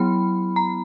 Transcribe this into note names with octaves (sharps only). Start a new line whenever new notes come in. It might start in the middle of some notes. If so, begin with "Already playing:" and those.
Already playing: F#3 B3 E4 B5
A#5